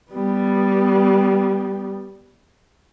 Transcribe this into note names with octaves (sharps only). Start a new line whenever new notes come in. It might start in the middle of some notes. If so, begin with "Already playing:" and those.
G3 B3